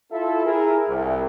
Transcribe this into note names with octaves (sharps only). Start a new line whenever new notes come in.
E4 F4 A4 E5
E4 G#4 A#4
C2